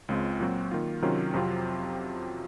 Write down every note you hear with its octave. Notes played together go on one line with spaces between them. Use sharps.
C#2 C#3 G#3 C4 F4
A#2 F#3 C4 F#4
D#3 A#3 F4
C3 D#3 F#3 C#4 F4
F2 C3 F#3 C4 F4